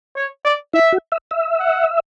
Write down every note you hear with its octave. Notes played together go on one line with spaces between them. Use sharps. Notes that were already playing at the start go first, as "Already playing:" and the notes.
C#5
D5
E4 E5
F#4
E5
E5
F#5